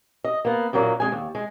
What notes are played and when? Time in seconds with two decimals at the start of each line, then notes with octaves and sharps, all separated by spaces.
0.24 D#5
0.45 A#3 B3
0.73 F#2 A#2 F#3 A#3
1.00 F2 G#3 G#5
1.12 D#2
1.35 G#3